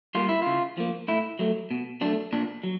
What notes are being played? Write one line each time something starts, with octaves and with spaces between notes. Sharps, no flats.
G3 A#3 F4
E4
C#3 F4
F3 A#3
A2 E4
F#3 A3
B2
F#3 A3 D4
A#2 D4
F#3